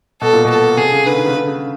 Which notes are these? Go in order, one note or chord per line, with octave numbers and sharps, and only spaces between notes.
B2 A4
A#2
B2
A4
C3 G#4
C#3
D3 B4
D#3
C#3
D3
C#3